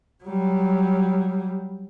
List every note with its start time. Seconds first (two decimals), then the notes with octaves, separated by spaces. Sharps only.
0.24 F#3 G3